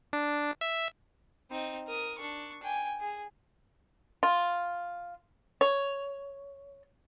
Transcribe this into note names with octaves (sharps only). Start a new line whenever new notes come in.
D4
E5
C4 D#4
A#4 D#6
D4 C#6
G5 G#5
G#4
F4
C#5